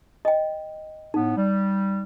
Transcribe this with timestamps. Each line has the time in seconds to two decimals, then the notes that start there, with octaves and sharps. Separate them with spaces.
0.25 D#5 G5
1.14 A2 B3 D#4
1.36 G3